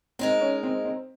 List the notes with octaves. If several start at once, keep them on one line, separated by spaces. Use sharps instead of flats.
G#3 C4 D#4 A#4
C#4
C4
C4